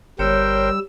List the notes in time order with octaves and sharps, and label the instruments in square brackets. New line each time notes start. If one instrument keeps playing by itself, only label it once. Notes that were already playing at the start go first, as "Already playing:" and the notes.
[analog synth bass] G1 [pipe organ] G3 E6 [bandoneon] A#4 C5 G5 [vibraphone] C#5